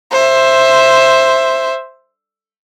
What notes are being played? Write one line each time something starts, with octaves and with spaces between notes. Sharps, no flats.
C5 E5